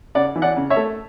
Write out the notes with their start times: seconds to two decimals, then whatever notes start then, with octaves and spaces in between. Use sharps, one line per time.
0.15 C#3 D5 F#5
0.36 E3
0.42 D5 F#5
0.56 C#3
0.70 C#5 E5
0.76 A3